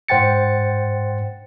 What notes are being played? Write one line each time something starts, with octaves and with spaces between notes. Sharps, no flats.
G#2 C5 F#5 G5 A6 C#7